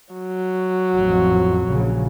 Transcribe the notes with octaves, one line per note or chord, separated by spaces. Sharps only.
F#3
A1 F2
A#1 C#3